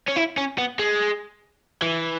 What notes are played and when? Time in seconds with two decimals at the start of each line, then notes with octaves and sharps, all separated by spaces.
0.08 C#4
0.17 E4
0.38 C#4
0.58 B3
0.79 G#3
1.82 E3